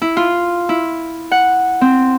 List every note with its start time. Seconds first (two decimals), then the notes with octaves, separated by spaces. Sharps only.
0.02 E4
0.17 F4
0.69 E4
1.32 F#5
1.81 C4